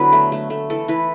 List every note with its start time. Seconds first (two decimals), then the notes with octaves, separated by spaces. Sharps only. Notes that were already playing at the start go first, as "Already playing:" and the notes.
Already playing: D3 F#3 B3 E4 B4
0.13 A3
0.32 A3
0.50 A3
0.70 E3 A4
0.88 E3 B4